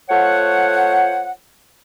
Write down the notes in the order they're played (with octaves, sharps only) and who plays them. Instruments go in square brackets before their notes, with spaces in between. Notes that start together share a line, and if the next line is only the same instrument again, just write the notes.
[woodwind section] A3 F4 C5 C#5 F#5